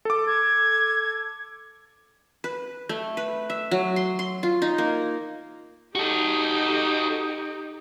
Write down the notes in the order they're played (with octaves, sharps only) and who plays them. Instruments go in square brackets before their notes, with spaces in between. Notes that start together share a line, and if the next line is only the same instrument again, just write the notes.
[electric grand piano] A4 D6
[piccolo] G#6
[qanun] B4
A3
B4
E5
F#3
C6
C6
F4
D#4
A#3
[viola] D#4 G4 [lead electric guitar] F#4 A4